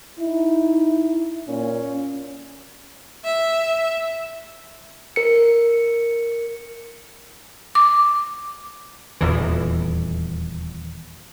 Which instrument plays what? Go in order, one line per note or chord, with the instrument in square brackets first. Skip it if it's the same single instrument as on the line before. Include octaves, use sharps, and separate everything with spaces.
[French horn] D#4 [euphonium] E4
[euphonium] A#2 [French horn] C#4
[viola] E5
[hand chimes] A#4 C#7
[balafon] D6
[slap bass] D#1 E2 E3